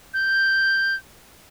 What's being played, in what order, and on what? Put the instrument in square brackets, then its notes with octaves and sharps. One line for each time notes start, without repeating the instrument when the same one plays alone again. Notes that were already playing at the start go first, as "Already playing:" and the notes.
[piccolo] G6